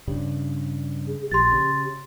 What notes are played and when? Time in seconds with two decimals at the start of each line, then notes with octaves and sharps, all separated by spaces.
0.08 G2 C#3 G3
1.08 G#4
1.31 A#1 G4 C6 A6
1.52 C#3